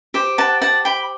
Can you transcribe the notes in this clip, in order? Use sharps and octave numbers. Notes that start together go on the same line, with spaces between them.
G4 C5
F#5 A5
F#5 A5
G5 B5